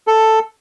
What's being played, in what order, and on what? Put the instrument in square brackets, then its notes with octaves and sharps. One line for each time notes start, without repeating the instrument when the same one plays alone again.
[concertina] A4